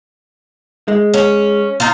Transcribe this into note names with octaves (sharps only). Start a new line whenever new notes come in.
G#3
C#4
D#4 F4